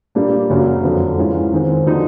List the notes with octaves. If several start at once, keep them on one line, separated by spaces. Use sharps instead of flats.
A#2 G3 A#3 D4
F#2 C#3 F#3 A#3
F2 D3 F#3
G#2 E3 G#3 C#4 F4
G#2 D#3 G#3 C4
D3 F3 A#3 D#4 F#4